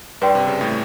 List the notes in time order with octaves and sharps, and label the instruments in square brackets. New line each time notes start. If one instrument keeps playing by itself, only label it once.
[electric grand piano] G2 [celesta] B4 D5 G5 C6
[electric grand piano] C3
C#3
A2